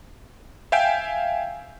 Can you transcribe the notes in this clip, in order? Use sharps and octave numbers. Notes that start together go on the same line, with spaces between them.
E5 F5 G5 G#5 G6 D7